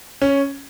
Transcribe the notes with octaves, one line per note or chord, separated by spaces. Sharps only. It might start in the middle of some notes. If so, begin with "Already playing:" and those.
C#4